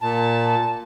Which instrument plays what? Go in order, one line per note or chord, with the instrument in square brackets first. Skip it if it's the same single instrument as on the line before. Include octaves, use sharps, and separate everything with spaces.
[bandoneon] A#2 [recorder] A5